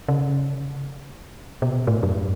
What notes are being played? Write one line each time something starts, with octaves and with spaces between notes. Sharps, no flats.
C#3
B2
A2
F#2